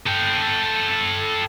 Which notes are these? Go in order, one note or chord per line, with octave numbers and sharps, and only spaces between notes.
A4 G5